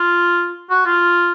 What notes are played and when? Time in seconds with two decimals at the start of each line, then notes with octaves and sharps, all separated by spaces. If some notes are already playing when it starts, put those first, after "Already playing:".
Already playing: F4
0.70 F#4
0.86 F4